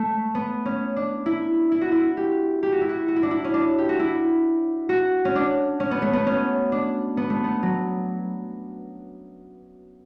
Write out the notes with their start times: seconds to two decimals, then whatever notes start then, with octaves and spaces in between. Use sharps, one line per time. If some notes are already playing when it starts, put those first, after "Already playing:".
Already playing: A3
0.35 B3
0.66 C#4
0.96 D4
1.26 E4
1.72 E4
1.81 F#4
1.92 E4
2.17 G4
2.63 G4
2.72 F#4
2.81 E4
2.89 F#4
3.08 F#4
3.16 E4
3.23 D4
3.31 E4
3.44 C#4
3.54 D4
3.78 G4
3.89 F#4
3.99 E4
4.89 F#4
5.25 C#4
5.36 D4
5.80 C#4
5.91 B3
6.02 A3
6.13 B3
6.27 C#4
6.72 D4
7.17 B3
7.30 A3
7.44 B3
7.63 F#3